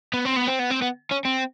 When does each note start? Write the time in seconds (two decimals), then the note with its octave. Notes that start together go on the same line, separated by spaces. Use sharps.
0.14 B3
0.25 C4
0.36 B3
0.48 C4
0.60 B3
0.71 C4
0.82 B3
1.12 C#4
1.25 C4